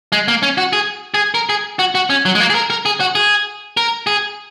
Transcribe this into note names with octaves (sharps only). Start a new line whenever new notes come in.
G#3
A#3
C#4
F#4
G#4
G#4
A#4
G#4
F#4
F#4
C#4
F#3
G#3
A#3
G#4
A#4
A#4
G#4
F#4
G#4
A#4
G#4